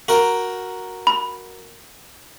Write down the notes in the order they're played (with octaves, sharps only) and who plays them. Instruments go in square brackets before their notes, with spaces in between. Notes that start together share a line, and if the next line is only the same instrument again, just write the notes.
[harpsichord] F#4 A#4 G5
[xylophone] B5